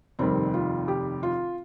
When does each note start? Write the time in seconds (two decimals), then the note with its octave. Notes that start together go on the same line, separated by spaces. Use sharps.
0.19 F1 D#2 D#3 G3 C4
0.54 F4
0.88 G4
1.23 F4